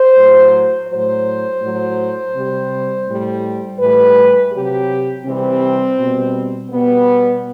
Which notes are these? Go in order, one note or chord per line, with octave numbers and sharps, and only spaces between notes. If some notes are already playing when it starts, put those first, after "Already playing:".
Already playing: C5
A2 F#3
A2 F#3 C5
A2 F#3
C3 G3
A2 G3
A2 E3 G3 B4
C3 F#3 G4
C3 E3 G3 C4
B2 G3
B2 G3 B3